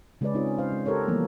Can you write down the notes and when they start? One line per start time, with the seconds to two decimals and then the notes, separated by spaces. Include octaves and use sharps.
0.21 C#3 G#3 C#4 G#4 B4 D5
0.35 C4 C#4 D#4 F4 G#4
0.58 C5 F5
0.72 G#3
0.86 G4 A4 A#4 C5 C#5
1.08 E3 F3 G3 A#3 B3